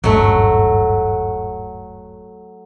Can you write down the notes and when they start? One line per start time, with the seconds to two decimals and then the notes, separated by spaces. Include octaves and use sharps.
0.04 D#1 G#1 G2 F#3 A3